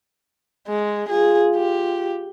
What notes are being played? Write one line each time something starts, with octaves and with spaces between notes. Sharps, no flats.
G#3
F4 G#4
G4